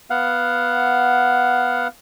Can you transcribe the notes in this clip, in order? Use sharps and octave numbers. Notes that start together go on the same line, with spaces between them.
B3 F5 F#5